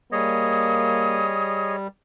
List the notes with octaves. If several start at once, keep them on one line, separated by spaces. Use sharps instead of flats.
G3 A#3 G#4 C#5 D#5 D#6